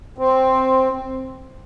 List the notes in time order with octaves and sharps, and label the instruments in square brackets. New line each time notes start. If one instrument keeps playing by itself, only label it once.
[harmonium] C4